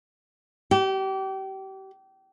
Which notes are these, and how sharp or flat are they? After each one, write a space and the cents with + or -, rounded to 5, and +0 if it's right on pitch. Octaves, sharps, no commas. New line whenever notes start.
G4 -30